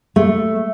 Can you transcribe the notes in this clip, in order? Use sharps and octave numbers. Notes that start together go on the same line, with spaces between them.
A3